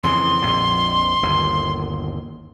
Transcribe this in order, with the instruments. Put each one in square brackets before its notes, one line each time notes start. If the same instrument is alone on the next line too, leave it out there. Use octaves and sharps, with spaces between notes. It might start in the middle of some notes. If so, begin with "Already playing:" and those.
[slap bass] F2 C#3 E3 [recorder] C6
[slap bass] A#1 F2 A#2
G1 D#2